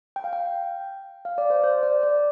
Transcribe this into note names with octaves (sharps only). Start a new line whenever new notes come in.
G5
F5
G5
F5
D5
C5
C5
D5
D5